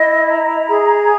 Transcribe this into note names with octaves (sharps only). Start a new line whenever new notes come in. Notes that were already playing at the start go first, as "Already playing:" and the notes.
Already playing: E4 D#5
A#5
G#4